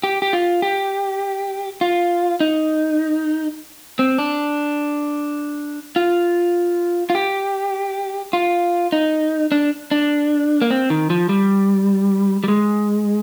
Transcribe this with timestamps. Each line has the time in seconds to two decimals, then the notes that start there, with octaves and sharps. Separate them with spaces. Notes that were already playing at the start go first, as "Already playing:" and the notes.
0.04 G4
0.22 G4
0.33 F4
0.62 G4
1.81 F4
2.40 D#4
3.99 C4
4.19 D4
5.96 F4
7.10 F4
7.15 G4
8.33 F4
8.92 D#4
9.52 D4
9.91 D4
10.61 A#3
10.71 C4
10.90 D#3
11.10 F3
11.29 G3
12.44 G3
12.48 G#3